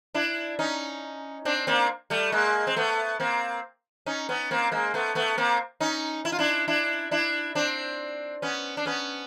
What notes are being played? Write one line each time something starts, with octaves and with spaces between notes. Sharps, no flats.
D4 E4
C#4 D#4
C4 D4
A#3 C4
G3 A3
G#3 A#3
C4
A3 B3
A#3 C4
C#4 D#4
B3 C#4
A#3 C4
G#3 A#3
A3 B3
A3 B3
A#3 C4
C#4 D#4
E4
F4
D4 E4
D4 E4
D4 E4
C4 D4
B3 C#4
D4
B3 C#4